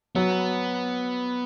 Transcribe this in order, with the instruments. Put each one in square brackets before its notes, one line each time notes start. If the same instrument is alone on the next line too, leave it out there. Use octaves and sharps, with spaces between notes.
[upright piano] F#3 [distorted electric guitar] B3